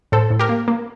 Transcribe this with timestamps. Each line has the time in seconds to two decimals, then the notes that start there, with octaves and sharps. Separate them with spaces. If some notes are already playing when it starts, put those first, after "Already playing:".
0.12 A2 A4 C5
0.31 A2
0.39 G4 A#4
0.49 A#3
0.68 A#3